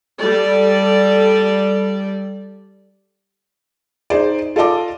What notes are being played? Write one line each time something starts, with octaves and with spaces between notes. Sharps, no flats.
G3 A4 D5
D#4 G#4 C5 D5
F4 A4 D5 D#5 A5 D6